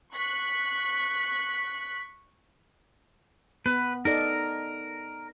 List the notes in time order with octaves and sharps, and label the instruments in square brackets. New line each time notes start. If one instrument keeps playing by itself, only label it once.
[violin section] C#6 F#6 B6
[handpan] B3 [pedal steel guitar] B4
[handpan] D#4 A4 D5 [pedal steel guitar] A#4